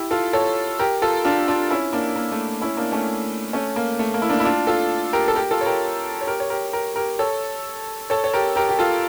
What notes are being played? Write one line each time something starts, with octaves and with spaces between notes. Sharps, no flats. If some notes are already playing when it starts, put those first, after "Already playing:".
Already playing: E4 G4
F4 A4
A4 C#5
G4 A#4
F4 A4
D4 F4
D4 F4
C#4 E4
A#3 D4
A#3
A3
C#4 E4
A#3 D4
A3 C#4
A3 C#4
A#3
A3
A#3
E4
A#3 D4
E4
D4 F4
F4 A4
G4 A#4
A4
G4 A#4
F4 A4
C#5
G4 A#4
C#5
G4 A#4
C#5
G4 A#4
G4 A#4
G4 A#4
A4 C#5
A4 C#5
C#5
G4 A#4
G4 A#4
G4
F4 A4